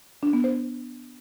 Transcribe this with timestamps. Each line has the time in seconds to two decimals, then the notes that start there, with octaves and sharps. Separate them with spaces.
0.23 D4
0.33 B3
0.44 C5